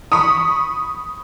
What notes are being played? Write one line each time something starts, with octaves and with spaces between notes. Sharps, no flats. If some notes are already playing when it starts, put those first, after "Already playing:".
B5 C#6 D#6